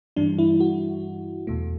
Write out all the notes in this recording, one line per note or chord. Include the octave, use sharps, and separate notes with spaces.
G2 E3 G3 D4
E4
F#4
E2 B2 A3